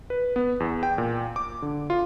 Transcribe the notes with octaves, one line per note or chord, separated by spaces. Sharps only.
B4
B3
E2
G5
A#2
D6
D3
F4